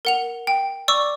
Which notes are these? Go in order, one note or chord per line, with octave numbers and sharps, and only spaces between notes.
A#4 F#5 F7
G5
D5 C#6 D6 E6